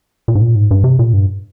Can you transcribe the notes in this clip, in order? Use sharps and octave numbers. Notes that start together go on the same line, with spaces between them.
A#2
G#2
A#2
G#2
G2
C3
A#2
G2